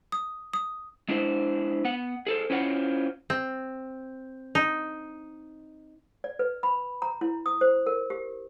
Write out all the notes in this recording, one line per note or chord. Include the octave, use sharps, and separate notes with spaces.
D#6
D#6
G#3 D4 E4 C5
B3 F#5
G#4 A4 C5
C#4 E4 F4 C5 C#5 F#5
C4
D#4
D5
B4
B5
A#5
E4
D#6
C5
A#4
G4